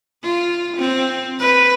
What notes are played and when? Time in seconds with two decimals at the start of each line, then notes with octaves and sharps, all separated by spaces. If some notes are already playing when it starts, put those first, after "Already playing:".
0.23 F4
0.77 C4
1.39 B4